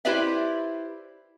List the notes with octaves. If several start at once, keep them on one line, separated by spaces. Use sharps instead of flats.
E4 G4 B4 C5 D5 E5